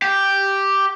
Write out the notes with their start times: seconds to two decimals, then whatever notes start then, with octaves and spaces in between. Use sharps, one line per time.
0.02 G4